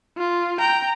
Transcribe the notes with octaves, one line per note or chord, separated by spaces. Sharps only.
F4
G5 A#5